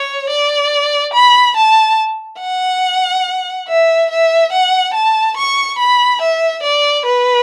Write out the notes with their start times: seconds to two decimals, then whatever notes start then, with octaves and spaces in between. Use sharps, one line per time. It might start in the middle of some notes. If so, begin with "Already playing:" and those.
Already playing: C#5
0.30 D5
1.14 B5
1.57 A5
2.41 F#5
3.68 E5
4.11 E5
4.53 F#5
4.94 A5
5.38 C#6
5.79 B5
6.22 E5
6.63 D5
7.06 B4